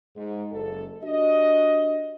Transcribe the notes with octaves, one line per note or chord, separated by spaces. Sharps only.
G#2
F#1 A4
D4 F#4 G4 D#5